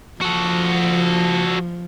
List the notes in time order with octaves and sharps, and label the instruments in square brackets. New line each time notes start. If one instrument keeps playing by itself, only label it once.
[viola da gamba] F3 [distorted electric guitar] F#4 A4